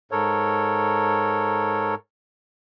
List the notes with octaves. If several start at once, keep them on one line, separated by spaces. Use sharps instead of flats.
G#2 A4 A#4 C#5